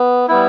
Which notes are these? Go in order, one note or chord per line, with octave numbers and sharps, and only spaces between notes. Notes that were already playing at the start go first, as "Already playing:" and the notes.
Already playing: B3
G3 B3 E4